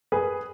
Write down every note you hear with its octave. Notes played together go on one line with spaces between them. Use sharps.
G#4 B4